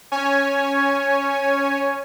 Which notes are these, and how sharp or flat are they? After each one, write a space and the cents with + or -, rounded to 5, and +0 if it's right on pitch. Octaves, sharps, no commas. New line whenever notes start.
C#4 +0 C#5 +0 G#5 +5